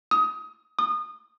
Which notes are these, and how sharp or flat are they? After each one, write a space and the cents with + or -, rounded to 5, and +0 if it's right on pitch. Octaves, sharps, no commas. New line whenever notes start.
D#6 +25
D#6 -25